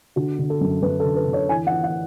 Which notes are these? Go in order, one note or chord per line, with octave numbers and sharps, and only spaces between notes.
D3 F#4
D3
A4
F#2
F#2 B4
A4
D3
B4
D3
C#5
E3 G#5
F#5
E3
F#5